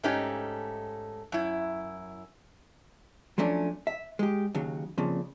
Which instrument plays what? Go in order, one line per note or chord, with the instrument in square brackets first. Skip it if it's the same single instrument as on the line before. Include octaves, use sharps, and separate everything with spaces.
[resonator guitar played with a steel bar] G#2 A3 C#4 D#4 G4
F#2 E4
[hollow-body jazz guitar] F3 F#3 A3 C#4 D4
E5
G#3 G4
D#2 C#3 F#3
F2 A#2 C#3